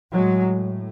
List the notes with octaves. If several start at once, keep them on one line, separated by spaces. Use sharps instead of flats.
A2 F#3 G#3